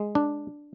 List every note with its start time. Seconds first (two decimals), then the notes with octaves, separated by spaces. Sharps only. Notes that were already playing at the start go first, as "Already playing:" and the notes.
Already playing: G#3
0.15 D4